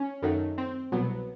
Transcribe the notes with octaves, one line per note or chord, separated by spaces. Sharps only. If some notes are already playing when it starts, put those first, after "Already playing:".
Already playing: C#4
F#2 D#3 F#3 A3
C4
C2 B2 F#3 B3